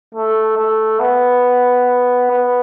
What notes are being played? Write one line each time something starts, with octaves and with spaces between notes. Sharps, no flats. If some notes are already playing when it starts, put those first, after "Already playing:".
A3
A3
B3
B3